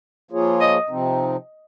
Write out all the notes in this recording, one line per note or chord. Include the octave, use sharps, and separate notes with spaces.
F3 A#3 F4 G#4 C#5
D#5
C3 F3 C4 D#4